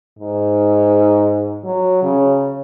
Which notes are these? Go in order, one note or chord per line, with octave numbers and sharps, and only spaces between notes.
G#2
F#3
C#3